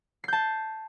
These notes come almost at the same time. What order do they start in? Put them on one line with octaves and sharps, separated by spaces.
C7 G6 A5